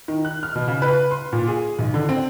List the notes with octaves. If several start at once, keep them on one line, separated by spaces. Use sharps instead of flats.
D#3
F#6
F6
B2
C#3
B4
C6
A#2
G#4
B1
D3
C4